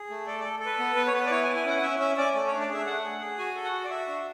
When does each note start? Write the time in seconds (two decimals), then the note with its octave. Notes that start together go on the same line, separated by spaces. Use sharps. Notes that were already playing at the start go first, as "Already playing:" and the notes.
Already playing: G#4
0.10 A3
0.27 A4 D5
0.40 D5
0.44 A4
0.59 A4
0.66 B4
0.79 B3
0.96 B3 B4
1.07 C#5
1.13 B3 B4
1.26 D5
1.30 E4 C#5
1.44 G#5
1.48 E4
1.56 G#5
1.65 C#4 F#5
1.77 F#5
1.82 C#4 E5
1.99 C#4 E5
2.17 C#4 D5
2.34 A3 D5
2.47 C#5
2.52 D4
2.60 D5
2.69 G#4 E5
2.86 A3 F#5
3.04 G#4
3.21 G#4
3.38 F#4 G#5
3.55 A4
3.64 F#5
3.73 F#4
3.84 D5
3.90 F#4 E5
4.08 D4